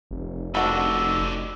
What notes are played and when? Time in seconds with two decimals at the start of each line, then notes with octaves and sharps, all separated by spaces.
0.11 F1
0.55 A3 D4 D#4 F#4 B5 E6